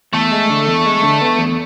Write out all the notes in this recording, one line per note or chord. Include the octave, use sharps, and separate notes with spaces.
E2 A3
G#3
D3
E2
G#3
D3
B3
E2